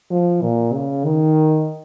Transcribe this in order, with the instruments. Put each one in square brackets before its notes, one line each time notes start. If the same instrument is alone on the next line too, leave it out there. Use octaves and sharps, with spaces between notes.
[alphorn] F3
A#2
C#3
D#3